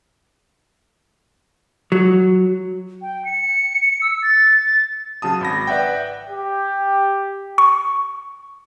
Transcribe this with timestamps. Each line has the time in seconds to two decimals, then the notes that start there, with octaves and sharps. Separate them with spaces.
1.92 F#3
3.02 G5
3.25 C#7
4.02 E6
4.22 A6
5.22 C#3 F#3 A5 D#6
5.41 G#1 B5 A#6
5.67 B4 D5 E5 F#5 G5
6.29 G4
7.58 C#6